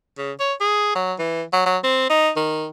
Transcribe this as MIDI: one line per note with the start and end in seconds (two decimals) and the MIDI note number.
0.18 0.33 49
0.40 0.53 73
0.61 0.93 68
0.95 1.13 54
1.19 1.43 52
1.53 1.62 54
1.66 1.78 54
1.84 2.07 60
2.10 2.31 63
2.36 2.68 51